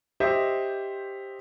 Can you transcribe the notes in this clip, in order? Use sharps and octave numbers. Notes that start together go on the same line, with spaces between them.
G4 C5 D#5 E5